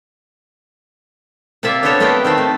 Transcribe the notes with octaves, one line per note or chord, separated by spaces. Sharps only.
C3 A#3 F4 D5 E5
B3 D4 F4 G4 A4 C#5
A3 B3 C4 A#4 D#5 G5
D#3 A3 C4
A3